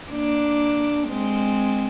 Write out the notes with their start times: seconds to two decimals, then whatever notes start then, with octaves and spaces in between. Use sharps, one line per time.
0.11 A#3 D4
1.08 G#3 C4